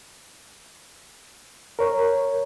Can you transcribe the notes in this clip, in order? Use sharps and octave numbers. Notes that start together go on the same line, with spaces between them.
A#4 C#5